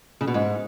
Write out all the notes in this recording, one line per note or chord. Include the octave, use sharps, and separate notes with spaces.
C#3
B2
G#2